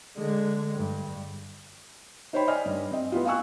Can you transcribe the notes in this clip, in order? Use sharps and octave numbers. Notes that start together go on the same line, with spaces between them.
D3 G#3
G2
D#4 C5 C#5 G5 B5
D5 D#5 G#5 F6
G2
C4 D#5
B3 E4 F4
F5 G5 G#5 C#6 E6 F#6